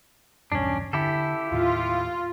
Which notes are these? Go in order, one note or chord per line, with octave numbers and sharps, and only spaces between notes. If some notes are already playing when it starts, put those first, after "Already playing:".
B1 E2 G2 C#4 D4
D3 E4 G4 A4
D#2 A2 F4